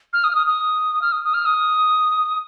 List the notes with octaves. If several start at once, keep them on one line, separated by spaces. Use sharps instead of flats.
F6
D#6
F6
D#6
D#6
F6
D#6
D#6
F6
D#6